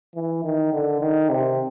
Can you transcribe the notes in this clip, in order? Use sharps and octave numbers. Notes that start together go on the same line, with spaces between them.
E3
D#3
D3
D#3
C3